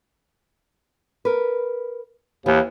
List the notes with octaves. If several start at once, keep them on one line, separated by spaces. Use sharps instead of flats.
A#4 B4
D#2 E3